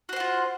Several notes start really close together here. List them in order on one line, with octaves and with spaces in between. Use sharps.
F#4 C5 F#5 F4